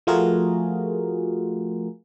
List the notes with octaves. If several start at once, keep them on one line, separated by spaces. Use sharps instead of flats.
F3 A3 F4 F#4 G#4 A#4